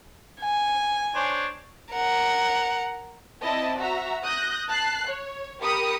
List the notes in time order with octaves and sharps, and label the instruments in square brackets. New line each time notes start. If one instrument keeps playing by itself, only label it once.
[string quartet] G#5
[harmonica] D4 C5 C#5
[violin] A#4 F#5
[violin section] C4 E4 D5 D#5 A5
F#4 E5 A#5
D#6 F#6 G6 A#6
A5 F#6 C7
C#5
G4 A#4 B5 D#6 C#7